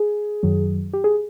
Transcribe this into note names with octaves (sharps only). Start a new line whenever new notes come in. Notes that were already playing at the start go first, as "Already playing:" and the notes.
Already playing: G#4
F#2 D#3 F#3
G4
G#4